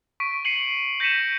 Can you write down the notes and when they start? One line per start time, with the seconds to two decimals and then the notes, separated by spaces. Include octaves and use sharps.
0.20 C#6 B6 D7
0.45 C7 C#7 D#7 F#7
1.00 G6 A#6 B6 C#7 D#7 E7